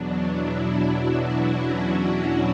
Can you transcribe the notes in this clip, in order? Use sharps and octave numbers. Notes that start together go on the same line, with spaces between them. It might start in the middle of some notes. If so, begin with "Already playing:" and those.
Already playing: E2 B2 F#3 D4
E4
E4
F#4
C#4
C#4